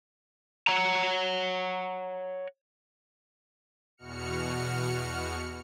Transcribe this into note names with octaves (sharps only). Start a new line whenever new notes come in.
C#5 F#5 A#5
E2 B2 F#4 F6 C#7